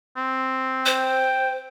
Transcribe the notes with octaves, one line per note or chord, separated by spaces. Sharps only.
C4
C5 G5